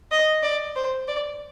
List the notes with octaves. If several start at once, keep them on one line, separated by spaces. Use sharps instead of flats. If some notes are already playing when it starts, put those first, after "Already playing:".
D#5
D5
C5
D5